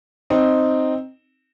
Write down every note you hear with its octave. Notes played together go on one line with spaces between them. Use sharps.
C4 D#4